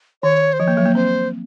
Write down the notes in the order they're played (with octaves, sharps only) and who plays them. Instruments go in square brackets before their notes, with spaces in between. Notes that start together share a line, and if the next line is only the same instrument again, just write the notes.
[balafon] D#3 [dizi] C#5
[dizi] C5
[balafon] F3 [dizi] C#5
[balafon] A#3
F#3
A#3
[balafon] C4 [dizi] C5